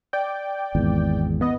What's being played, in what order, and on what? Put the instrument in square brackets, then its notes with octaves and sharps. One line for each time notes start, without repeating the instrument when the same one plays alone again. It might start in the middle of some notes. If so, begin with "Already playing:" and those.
[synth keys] D5 G5
[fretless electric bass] G#1 E2
[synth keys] B3 D#5